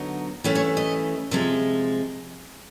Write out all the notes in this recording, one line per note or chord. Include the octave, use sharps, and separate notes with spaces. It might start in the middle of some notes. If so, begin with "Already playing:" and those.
Already playing: D3 F#3 B3 D#4
E3 A3 C#4 E4 G4
C#5
D#5
C3 F3 G#3 E5